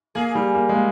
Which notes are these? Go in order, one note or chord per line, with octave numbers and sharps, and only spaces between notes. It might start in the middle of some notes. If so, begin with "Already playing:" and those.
A#3 G#4
G3
A#3
G#3
A#3